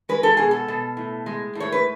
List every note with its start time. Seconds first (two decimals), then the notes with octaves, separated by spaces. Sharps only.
0.09 G#3 B4
0.23 A4
0.37 B2 G#4
0.51 A4
0.68 B2
0.97 A2
1.26 G#3
1.55 A2 C#5
1.72 B4